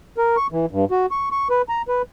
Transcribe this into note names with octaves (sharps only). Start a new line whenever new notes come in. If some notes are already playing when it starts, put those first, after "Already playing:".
A#4
C#6
E3
G2
F#4
C#6
C#6
B4
A#5
B4